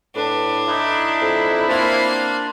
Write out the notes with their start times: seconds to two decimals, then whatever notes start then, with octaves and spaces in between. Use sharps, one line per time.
0.16 A2 D4 B4
0.68 D#4 E4 F#6
1.21 F2
1.68 A#3 C4 D4 F4 D5 F5